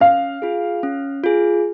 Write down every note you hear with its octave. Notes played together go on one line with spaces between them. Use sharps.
C#4 F5
F4 G#4
C#4
F4 G#4